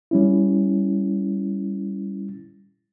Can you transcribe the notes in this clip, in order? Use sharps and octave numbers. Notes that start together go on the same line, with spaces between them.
G3 C#4 E4